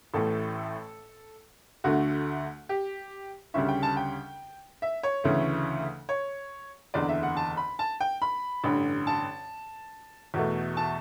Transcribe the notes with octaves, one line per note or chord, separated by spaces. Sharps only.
A1 A2 E3 A3 A4
D2 D3 A3 F#4
G4
D2 C#3 G3 C#4 E5
G5
A5
G5
E5
C#5
D2 C#3 E3 A3 E4
C#5
F#1 E2 D3 D5
E5
F#5
A5
B5
A5
G5
B5
A1 G2 D3
A5
E2 B2 A3
A5